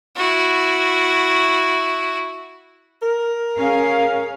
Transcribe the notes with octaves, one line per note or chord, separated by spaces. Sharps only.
E4 F#4
A#4
C#4 G#4 F5